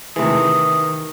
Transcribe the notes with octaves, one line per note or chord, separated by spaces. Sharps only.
C3 D#3 E3 A3 G#4 D#6